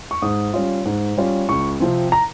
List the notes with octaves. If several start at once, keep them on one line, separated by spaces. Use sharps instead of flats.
C#6
G#2 D#6
G3 C#4 F4
G#2
G3 C#4 F4
C#2 C#6
C3 F3 C4
A#5